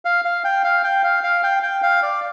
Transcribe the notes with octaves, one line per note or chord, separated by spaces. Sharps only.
F5
F5
G5
F5
G5
F5
F5
G5
G5
F5
D5